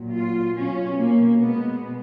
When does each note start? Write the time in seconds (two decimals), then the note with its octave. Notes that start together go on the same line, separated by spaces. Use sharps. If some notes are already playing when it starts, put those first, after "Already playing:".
Already playing: A#2 F#3
0.13 F4
0.56 B2 F#3 C#4
0.98 A#3
1.41 B2 G#3 B3